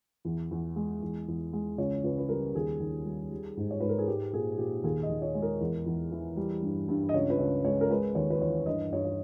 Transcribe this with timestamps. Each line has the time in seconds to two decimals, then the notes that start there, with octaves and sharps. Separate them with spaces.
0.25 E2
0.51 E2
0.76 G#3
1.02 E2
1.28 E2
1.53 G#3
1.78 C#2 C#5
2.04 C#2 B4
2.18 B4
2.29 G3 A#4
2.55 D#2 G#4
2.80 D#2
3.05 G3
3.31 G3
3.57 G#2
3.71 C#5
3.80 G#2 B4
3.89 A#4
3.98 G#4
4.08 G#3 G4
4.33 A#2 G#4
4.58 A#2 G4
4.84 D#2 G#4
5.03 D#5
5.09 D#2
5.22 C#5
5.35 G#3
5.42 A#4
5.61 E2
5.86 E2
6.12 E3
6.37 G3
6.62 G2
6.88 G2
7.09 D#5
7.14 C#2 C#5
7.30 B4
7.39 C#2 C#5
7.64 G#3 C#5
7.81 A#4
7.90 G#3 B4
8.15 D#2 C#5
8.30 B4
8.41 E3 C#5
8.66 G2 D#5
8.92 G2 C#5
9.05 C#5